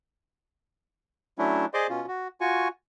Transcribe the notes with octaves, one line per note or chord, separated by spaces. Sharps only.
F#3 A3 C#4 D4 E4
G#4 C5 D5 D#5 C6 D6
B2 C#4 F4
F#4
F4 F#4 G#5 C#6